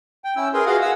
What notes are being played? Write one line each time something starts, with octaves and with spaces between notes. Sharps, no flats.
G5
C#4 E4 E6
G#4 A#4 B4 C6
F4 F#4 G#4 D#5 F5 F#5
F#5 G#5 E6